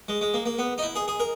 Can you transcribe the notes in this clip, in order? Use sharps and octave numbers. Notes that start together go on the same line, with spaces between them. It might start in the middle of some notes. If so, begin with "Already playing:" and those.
G#3
G#3
A#3
A#3
B3
D#4
E4
G#4
G#4
A#4